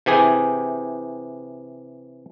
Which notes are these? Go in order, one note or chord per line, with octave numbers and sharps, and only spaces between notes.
C3 E3 G4 G#4